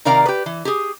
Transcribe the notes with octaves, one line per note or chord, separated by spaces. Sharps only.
C3 D#3 A#4 D5 F5 A#5
G4 B4
E3
G4 G#4